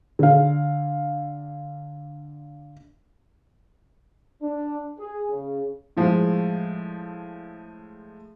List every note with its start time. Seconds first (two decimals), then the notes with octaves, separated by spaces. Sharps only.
0.19 D3 F5
4.43 D4
4.99 G#4
5.30 C#3
5.97 A2 F3 G#3 F4